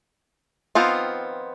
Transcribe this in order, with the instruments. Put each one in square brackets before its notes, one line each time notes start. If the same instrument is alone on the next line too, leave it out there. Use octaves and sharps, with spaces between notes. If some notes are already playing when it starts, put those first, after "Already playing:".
[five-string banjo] D#3 F3 B3 C4 F4